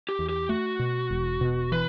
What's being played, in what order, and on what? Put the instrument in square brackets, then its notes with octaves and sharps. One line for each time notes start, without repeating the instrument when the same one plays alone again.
[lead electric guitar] G4
[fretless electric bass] E2
[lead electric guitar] G4
[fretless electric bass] A3 [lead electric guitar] F#4
[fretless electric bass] B2
E1
B2
[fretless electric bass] E3 [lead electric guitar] B4